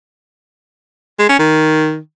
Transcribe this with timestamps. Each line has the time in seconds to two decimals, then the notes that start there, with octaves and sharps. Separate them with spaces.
1.19 G#3
1.29 C#4
1.39 D#3